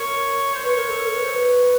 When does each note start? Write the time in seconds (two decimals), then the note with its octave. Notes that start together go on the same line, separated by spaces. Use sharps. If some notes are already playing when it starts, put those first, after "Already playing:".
Already playing: A#4 C#5
0.55 C5
0.63 B4 C#5
0.75 A#4
0.89 A4
1.02 A#4
1.15 B4
1.23 C5
1.32 B4